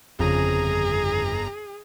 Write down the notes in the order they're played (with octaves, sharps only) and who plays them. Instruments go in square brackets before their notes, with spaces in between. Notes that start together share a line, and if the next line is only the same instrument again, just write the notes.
[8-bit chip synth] G1 A#5 [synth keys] F2 C#3 [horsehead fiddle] G#4